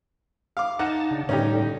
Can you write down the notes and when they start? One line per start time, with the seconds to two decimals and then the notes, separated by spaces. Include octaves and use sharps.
0.57 F5 D6
0.79 D#4 F#5 A5
1.11 C#3 D4
1.29 A2 D3 G3 C#4 D#4 G4